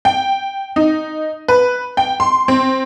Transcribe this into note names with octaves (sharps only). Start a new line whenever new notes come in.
G5
D#4
B4
G5
C6
C4